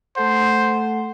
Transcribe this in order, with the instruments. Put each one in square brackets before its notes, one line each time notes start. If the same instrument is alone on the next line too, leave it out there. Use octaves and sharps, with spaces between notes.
[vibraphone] A3 A4 F#5 [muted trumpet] C5